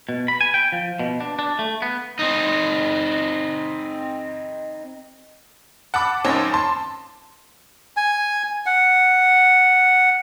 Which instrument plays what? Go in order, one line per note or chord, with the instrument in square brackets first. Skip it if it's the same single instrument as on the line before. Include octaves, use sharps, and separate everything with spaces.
[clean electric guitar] B2
B5
G#5
G5
F3
B2
D4
D4
A3
B3
[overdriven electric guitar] C4 D#4
[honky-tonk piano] F#5 A5 B5 D6
F#2 A#2 C4 D#4 C#5 A5
A5 C6
[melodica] G#5
F#5